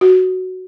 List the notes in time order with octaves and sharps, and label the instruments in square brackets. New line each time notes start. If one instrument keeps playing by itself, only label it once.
[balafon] F#4